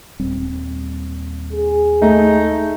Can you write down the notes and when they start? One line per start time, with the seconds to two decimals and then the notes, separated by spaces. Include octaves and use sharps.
0.20 D#1 G3 C4
1.53 G#4
2.02 A3 D#4